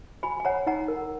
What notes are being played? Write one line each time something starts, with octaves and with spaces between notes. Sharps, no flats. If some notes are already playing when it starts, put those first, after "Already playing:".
F#4 G#5 B5
G#5
C#5 F#5 A#5
D#4 F#5 A#5
A#4